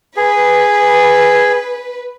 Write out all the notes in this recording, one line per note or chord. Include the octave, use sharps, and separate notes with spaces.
G#4 B4